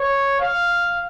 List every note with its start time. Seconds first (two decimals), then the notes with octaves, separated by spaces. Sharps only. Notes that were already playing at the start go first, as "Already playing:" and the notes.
Already playing: C#5
0.40 F5